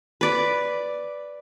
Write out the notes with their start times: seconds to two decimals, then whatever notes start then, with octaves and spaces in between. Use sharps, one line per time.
0.21 B4 D5